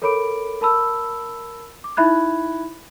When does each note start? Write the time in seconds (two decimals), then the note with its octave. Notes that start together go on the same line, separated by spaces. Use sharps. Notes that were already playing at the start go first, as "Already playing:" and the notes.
0.02 A4 A#4 C#5 B5 D6 D7
0.61 A#4 A5 B5 E6
1.84 D6
1.97 D#4 E4 E5 B5 F#6 G#6